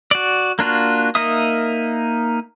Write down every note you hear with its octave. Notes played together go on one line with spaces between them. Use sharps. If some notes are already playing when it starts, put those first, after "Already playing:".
F#4 D5
A#3 D4 F4 F#4
A#3 D#4 A#4 E5 D#6